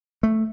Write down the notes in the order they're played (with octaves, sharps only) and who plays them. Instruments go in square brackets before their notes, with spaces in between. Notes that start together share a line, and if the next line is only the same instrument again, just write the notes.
[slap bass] A3